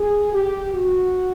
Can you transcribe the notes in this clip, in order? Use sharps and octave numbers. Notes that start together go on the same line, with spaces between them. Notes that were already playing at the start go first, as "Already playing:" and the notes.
Already playing: G#4
G4
F#4